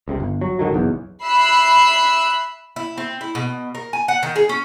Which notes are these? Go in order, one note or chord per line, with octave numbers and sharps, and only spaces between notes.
C#2 A2 C3
G1
F#3
G#2 D3 D#3 F#3
F#1 B1 E2
E5 B5 E6 F#6 C7
E4
C4
E4
B2
A#4
G#5
F#5
D#3
G#4
C#4